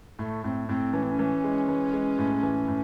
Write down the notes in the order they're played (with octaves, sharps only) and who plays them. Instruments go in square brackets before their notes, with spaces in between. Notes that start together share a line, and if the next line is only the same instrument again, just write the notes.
[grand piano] A2 [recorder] A3
[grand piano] A2 [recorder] C4
[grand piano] A2 [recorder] C4
[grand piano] E3 [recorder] C#4
[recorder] C4
C#4
[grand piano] E3
G#3
E3
G#3
A2
E3
A2